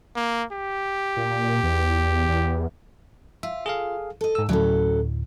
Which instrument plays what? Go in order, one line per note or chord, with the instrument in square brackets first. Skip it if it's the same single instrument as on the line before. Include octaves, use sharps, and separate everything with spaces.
[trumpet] A#3
G4
[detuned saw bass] A#2
E2
E2
[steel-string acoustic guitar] F4 [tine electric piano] E5
[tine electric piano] G#4 A4 F5
[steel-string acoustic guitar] A4 D#5
[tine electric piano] G#2 E6
[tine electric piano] D2 A2 [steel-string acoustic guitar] F#3 C#4 A4